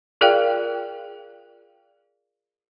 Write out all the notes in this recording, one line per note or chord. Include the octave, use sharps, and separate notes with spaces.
F4 G#4 A#4 D5 F5 G5